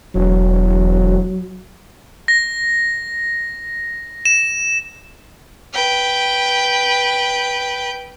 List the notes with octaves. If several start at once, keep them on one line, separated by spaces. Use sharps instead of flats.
E1 F#3
A#6
E7
B4 G5